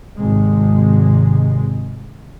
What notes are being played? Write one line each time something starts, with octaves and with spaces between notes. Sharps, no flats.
G#1 C3 G#3